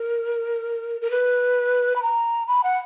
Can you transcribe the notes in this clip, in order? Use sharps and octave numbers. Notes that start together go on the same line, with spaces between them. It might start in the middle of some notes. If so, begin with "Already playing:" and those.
Already playing: A#4
A#4
B4
B5
A#5
B5
F#5